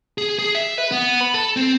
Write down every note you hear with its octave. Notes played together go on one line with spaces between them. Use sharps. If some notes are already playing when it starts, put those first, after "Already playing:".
G#4
G#4
E5
B4
B3
B5
A4
C4